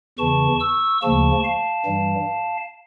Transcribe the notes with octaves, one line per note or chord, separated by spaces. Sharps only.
E2 C#3 E3 A5 C#6
C#6 E6
D2 C#3 F3 A#3 A5 C#6
F5 A5
G2 E3 G3